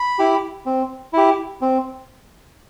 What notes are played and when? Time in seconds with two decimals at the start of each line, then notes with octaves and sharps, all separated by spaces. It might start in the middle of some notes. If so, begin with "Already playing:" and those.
Already playing: B5
0.19 E4 G4
0.66 C4
1.13 E4 G4
1.61 C4